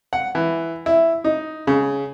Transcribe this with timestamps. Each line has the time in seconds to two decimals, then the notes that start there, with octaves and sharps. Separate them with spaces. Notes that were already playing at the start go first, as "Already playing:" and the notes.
0.13 F#5
0.35 E3
0.86 E4
1.24 D#4
1.67 C#3